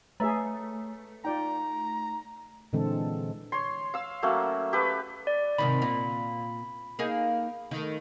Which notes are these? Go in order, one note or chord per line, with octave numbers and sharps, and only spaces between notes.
A3 G#4 B4 C#5 E5 A#5 B5
D#4 F4 D5 G5 A#5
A#2 D3 E3 G#3 C4 A4
C#5 C6
F5 E6
F#3 A3 A#3 C#4
G4 A4 B4
D5
G#2 C3 D#3 B5
A#2
A#3 D#4 G#4
D#3 A3